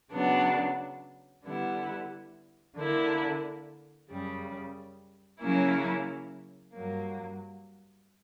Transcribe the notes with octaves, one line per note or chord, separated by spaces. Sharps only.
C#3 F#3 B3 D4
D3 G3 B3 E4
D3 A#3 E4
F#2 C#3 G3
C#3 F#3 A#3 C#4 E4
G2 F#3 A#3